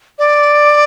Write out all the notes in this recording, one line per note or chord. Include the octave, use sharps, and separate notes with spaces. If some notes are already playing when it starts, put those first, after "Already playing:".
D5